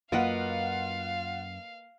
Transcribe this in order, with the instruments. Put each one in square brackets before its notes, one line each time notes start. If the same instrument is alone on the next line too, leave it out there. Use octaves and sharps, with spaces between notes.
[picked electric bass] F#2 [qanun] A#3 B4 D#5 [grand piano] F4 F#5 [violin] F5